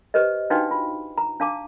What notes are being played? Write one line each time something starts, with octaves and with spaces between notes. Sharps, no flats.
G4 B4 C5 D#5
D4 D#4 F#4 B4 F5 G5
F4
A#5
D4 F5 A5 D6